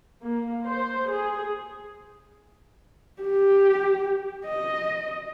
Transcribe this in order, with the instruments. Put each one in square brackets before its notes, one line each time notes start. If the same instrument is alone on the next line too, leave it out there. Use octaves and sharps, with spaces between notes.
[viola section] A#3
C5
G#4
[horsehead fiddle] G4
D#5